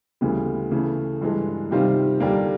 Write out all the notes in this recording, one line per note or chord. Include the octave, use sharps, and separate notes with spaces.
D2 C#3 E3 G3 B3
C#3 E3 A3
G2 E3 G#3
C3 D#3 G3 C4 F4
D#2 D3 G3 A#3 D4